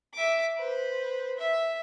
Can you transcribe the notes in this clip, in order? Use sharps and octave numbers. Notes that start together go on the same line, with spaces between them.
E5 D6
B4 C5
E5